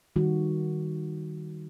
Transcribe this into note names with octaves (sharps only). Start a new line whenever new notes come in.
D#3 G3 F#4